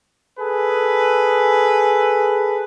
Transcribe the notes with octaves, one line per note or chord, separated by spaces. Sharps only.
G#4 A4 B4